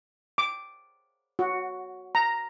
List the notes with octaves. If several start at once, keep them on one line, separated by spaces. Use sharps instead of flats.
D6
F#4
A#5